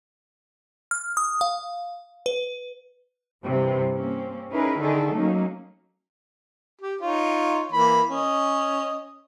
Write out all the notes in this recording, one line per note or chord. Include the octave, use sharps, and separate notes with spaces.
F6
D#6
F5
B4
G2 C3 E3
A#3 C4 C#4
C#4 D#4 E4 G#4 A#4 B4
D3 D#3 D#4 E4 G#4 A4
F#3 A3 A#3 C#4 D#4
G4
D#4 F4 C#5
E3 A#3 B5
C#4 D#5